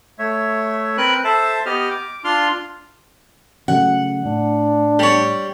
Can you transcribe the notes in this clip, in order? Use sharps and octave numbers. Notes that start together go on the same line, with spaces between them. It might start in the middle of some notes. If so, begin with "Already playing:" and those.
A3 C#5 E5
C4 A#4 B4 F#6
A4 C5 E5 A5
B3 G4 D#5 F6
D6
D4 F4 C6 F6
C#3 F#3 A3 F#5
A2 D4
G3 C#5